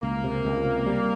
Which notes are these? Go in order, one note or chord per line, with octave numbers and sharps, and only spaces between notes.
C#2 A#3
C3
C#2
C3
G3